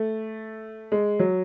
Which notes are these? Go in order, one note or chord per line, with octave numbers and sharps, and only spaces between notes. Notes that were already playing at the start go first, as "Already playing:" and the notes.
Already playing: A3
G#3
F#3